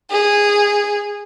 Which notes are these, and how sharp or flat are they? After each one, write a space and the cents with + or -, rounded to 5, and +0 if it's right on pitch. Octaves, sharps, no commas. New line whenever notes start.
G#4 -15